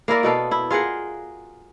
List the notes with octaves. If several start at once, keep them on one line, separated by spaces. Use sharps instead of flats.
A#3 E4 A#4 D5
B2 B3 A4 F5
E4
F4 G#4 A#4 F#5